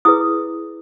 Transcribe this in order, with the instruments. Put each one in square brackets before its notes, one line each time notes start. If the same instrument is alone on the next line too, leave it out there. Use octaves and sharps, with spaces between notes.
[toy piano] E4 G#4 B4 D#6